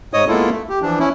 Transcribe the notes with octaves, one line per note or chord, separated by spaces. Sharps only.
G#2 C#5 D#5 D#6
G#3 A#3 B3 E4 F4 A4
A3
G4
E3 F3 D4
C#4 E4